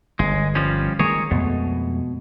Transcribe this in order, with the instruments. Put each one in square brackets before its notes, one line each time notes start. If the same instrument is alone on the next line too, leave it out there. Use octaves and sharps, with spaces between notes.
[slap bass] G1 [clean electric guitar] G#3
[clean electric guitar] F3 G3 C#4
[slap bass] D#3 G#3 A#3 [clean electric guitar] G#4 A#4 C#5
[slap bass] F2 G#3 A3 [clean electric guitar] B2